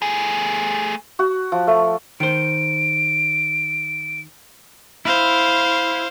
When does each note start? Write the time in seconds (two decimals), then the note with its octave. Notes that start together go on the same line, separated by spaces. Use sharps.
0.02 A3 G#4
1.19 F#4
1.52 F3
1.67 A3
2.20 D#3 C5 D7
5.05 E4 C5 F5